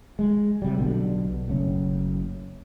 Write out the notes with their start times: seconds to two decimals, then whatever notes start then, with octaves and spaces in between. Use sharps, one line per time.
0.19 G#3
0.62 C3 G3
0.78 B1 B2 D3
1.48 F#1 A3 C#4